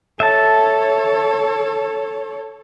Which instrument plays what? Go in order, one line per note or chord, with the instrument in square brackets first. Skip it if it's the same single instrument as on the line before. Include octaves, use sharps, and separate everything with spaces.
[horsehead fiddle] A4 C#5 [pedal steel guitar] E5 A5